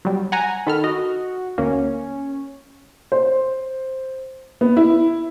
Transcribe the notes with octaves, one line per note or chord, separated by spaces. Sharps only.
F#3 G3
F#5 G#5 A#5
D#3 A4 B5 F6
F#4 D#5
D2 A#3 C#4
C5
B3
E4